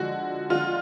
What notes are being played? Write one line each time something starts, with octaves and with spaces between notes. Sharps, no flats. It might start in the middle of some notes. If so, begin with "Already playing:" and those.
Already playing: D3 F3 G#3 F#4
D3 F3 G#3 F4